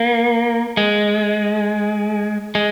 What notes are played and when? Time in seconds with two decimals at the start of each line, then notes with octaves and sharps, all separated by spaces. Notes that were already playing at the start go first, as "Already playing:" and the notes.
Already playing: A#3
0.77 G#3
2.55 G#3